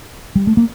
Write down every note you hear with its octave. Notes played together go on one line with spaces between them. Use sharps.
G3
A3
A#3